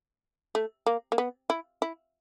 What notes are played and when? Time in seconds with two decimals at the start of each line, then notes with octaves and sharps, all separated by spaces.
0.55 A3
0.86 A#3
1.12 A#3
1.18 B3
1.50 E4
1.82 E4